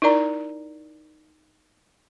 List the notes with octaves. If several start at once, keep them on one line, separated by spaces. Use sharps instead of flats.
D#4 E4 A#4 D5 A#5